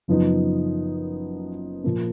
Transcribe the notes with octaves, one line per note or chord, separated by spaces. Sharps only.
F#1 F#2 F3 B3 D#4
A#2 F3 A#3